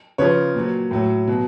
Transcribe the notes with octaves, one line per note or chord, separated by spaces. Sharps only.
C#3 F3 B4 C#5
A#2 F#3
A2 F#3
B2 F#3